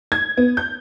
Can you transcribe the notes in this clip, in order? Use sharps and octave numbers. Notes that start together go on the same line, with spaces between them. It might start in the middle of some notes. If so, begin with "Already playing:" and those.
G#6
B3
G6